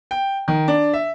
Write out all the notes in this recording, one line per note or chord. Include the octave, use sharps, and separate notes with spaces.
G5
D#3
D4
E5